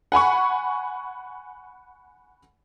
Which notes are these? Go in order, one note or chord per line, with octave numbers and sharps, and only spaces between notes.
F#5 G#5 B5 C#6